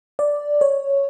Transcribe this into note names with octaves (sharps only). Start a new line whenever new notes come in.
D5
C#5